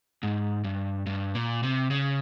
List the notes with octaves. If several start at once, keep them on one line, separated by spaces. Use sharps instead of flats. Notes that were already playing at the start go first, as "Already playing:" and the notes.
G#2
G2
G2
A#2
C3
C#3